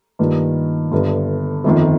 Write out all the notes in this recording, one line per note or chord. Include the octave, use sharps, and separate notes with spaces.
G2 D#3 A#3 F4
G1 G2 D3
G1 F2 D#3